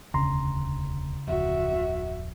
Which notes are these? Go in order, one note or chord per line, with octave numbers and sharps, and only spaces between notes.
E1 D2 C#3 A#5 C6
D1 F2 F#4 E5